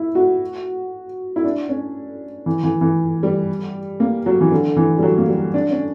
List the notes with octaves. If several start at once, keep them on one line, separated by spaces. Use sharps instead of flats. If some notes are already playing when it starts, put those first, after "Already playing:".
Already playing: E4
F#4
E4
D4
C#4
E3
E3
E3
G3
A#3
F#3
E3
D3
E3
G3
F#3
A#3
G3
D4
C#4